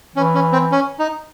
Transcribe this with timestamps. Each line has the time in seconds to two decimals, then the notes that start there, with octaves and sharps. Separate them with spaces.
0.16 E3 C#4
0.35 C#4
0.52 C4
0.72 C#4
0.99 D#4